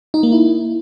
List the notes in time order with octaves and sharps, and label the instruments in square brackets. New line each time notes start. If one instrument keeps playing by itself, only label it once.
[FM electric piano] D#4
A#3
E4